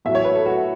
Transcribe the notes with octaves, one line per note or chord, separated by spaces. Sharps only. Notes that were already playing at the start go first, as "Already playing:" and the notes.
A1 A2 F#3 E5
C#5
B4
A4
F#4